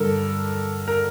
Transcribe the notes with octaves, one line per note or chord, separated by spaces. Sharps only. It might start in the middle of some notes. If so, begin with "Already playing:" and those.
Already playing: G2 D3 A4 A#4
A#4